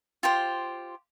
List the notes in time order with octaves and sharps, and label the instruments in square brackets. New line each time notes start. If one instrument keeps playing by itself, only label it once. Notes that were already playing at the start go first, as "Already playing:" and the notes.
[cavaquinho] F4 G4 C5